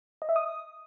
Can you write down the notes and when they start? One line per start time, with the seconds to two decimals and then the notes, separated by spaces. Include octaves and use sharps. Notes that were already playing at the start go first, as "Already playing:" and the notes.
0.22 D#5
0.29 E5
0.36 D#6